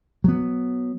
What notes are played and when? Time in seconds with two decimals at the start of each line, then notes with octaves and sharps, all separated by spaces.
0.24 F#3 B3